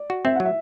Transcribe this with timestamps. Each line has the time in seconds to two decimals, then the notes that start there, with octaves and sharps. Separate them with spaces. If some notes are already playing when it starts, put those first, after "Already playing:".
Already playing: D5
0.10 F#4
0.25 C4 E5
0.36 F#3 F#5
0.45 E5